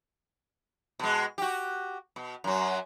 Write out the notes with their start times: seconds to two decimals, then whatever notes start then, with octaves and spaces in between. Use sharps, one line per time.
0.99 B2 G#3
1.38 F#4 G4
2.16 B2
2.44 F#2 F#3